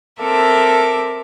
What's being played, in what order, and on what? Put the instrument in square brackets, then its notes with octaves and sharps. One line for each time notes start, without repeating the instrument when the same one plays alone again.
[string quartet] C4 A4 A#4 E5 D6